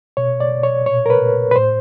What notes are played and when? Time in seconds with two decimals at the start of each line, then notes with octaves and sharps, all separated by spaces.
0.17 B2 C#5
0.40 D5
0.52 B2
0.63 C#5
0.86 A#2 C#5
1.06 A#4
1.10 B4
1.22 A#2
1.51 B4
1.56 A2 C5